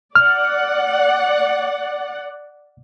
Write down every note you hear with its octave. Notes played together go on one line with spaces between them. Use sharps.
D5 F#5 F6